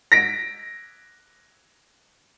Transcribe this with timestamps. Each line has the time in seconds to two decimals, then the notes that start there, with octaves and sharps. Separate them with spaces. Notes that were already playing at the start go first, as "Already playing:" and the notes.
0.12 A#6 B6 D7